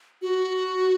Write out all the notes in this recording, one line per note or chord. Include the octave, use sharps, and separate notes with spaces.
F#4